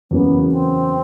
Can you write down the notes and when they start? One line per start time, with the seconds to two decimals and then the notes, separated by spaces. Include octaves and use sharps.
0.11 E2 C#3 F#3 A#3 B3 C#4
0.51 C4